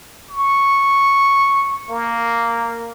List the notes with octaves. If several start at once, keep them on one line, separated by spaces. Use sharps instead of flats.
C#6
A#3